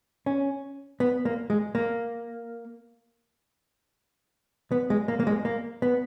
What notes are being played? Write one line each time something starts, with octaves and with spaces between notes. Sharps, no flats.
C#4
B3
A#3
G#3
A#3
B3
G#3
A#3
A#3
G#3
A#3
B3